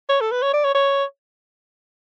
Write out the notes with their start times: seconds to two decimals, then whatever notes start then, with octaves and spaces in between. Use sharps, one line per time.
0.09 C#5
0.21 A4
0.31 B4
0.42 C#5
0.53 D5
0.64 C#5
0.75 C#5